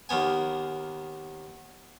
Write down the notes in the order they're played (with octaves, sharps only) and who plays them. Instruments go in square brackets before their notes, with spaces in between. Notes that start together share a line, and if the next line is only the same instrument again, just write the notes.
[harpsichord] D#2 A#3 B3 G#5